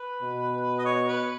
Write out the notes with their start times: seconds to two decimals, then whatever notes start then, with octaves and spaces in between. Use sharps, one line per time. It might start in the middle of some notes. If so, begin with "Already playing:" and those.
Already playing: B4
0.22 B2
0.79 D#5
0.85 C#5
1.07 B4